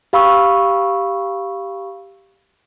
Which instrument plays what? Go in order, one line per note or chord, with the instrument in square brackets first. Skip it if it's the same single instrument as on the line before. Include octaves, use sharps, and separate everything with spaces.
[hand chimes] G4 F5 B5 C#6 E6